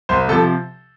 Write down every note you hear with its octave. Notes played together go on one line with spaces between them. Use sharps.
C2 C5
C3 F3 A4